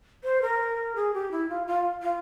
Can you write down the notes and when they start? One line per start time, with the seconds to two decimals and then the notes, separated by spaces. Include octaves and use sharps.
0.24 C5
0.42 A#4
0.95 G#4
1.14 G4
1.31 E4
1.49 F4
1.67 F4
2.02 F4